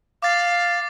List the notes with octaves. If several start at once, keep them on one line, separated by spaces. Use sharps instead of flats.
F5 D6 A6